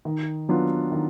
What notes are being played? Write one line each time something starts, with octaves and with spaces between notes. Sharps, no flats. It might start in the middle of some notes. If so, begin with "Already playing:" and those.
D#3
F#3 B3 D4 F4
D#3